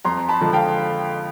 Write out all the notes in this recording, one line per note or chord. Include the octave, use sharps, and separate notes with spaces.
F2 A#5 C6
A5 B5
D3 F3 G#3
F5 G5